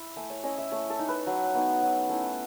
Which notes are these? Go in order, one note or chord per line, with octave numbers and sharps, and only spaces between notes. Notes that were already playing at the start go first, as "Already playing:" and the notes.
Already playing: E4 B5
A3 G#5
C#5
C#4 E4 D#5
E5
A3 C#5
A4
D#4
B4
F#3
B3 D#4
F#3
A3 C#4 E4